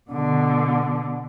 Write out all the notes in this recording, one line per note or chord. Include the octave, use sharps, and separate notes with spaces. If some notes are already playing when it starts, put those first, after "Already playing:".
B2 D3